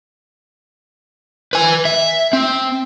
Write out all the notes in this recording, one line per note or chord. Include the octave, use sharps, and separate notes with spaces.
B4 G#5
E5
C4